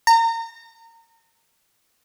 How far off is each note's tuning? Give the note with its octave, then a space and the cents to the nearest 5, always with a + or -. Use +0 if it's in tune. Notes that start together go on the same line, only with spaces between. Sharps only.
A#5 -30